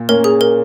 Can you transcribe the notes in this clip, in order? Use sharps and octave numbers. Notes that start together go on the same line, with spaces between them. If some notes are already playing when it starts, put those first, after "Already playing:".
Already playing: A#2
A#3 C#4 A#4
G#4
A#4